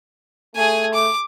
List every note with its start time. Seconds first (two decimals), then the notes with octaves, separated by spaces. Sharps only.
0.55 A3 G#4 G#5
0.94 D6